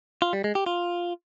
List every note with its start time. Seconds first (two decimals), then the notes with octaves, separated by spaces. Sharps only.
0.22 F4
0.33 G3
0.44 G#3
0.55 G4
0.66 F4